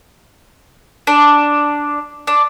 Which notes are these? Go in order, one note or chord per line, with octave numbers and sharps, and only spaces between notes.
D4
D4